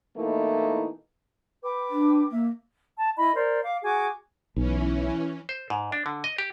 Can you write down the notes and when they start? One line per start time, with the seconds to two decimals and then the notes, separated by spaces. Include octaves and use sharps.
0.17 B2 E3 A3 A#3 D#4 E4
1.64 B4 G5 D6
1.90 D4
2.31 A#3 E5
2.97 A5
3.17 E4 D#5 B5
3.34 A#4 C5 D5
3.63 F5 D6
3.83 F#4 G#4 G#5 D6
4.56 B1 E3 C#4
5.49 C5
5.70 G#2
5.92 D4
6.06 D3
6.24 D#5
6.38 G4